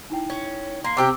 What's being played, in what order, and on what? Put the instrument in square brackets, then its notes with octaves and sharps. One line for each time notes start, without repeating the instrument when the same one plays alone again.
[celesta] D#4 E4 G5
[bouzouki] C#4
[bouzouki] A#3 [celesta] C6 C7
[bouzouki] C3 C4 G4 [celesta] D6 E6